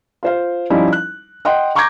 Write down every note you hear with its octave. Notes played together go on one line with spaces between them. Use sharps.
F4 C5 F5
F3 G3 C#4 D#4 E4
F#6
D#5 F#5 G5 C6
A#5 C#6 D6 G6 G#6 A#6